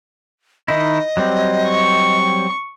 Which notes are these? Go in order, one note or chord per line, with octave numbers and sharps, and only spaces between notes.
D#3 D#4 E4 D#5
F#3 G3 C4
C#6